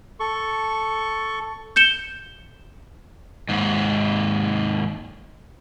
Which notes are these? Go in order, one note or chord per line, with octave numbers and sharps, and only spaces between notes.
A4 C#6
G6 C#7 E7 G7
D#2 G#2